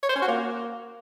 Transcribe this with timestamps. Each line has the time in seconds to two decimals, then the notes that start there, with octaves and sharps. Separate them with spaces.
0.03 C#5
0.10 C5
0.16 C#4
0.22 F#4
0.29 A#3